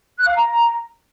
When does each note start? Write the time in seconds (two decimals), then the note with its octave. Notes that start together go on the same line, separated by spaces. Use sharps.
0.17 F#6
0.26 F5
0.35 A#5